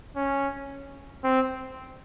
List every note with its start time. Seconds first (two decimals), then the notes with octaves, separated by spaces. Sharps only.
0.16 C#4
1.24 C4